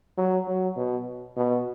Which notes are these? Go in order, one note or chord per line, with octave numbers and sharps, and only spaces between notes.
F#3
F#3
B2
B2